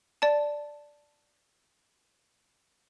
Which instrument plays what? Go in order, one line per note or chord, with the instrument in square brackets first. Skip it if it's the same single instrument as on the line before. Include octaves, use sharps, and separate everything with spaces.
[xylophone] D5 A5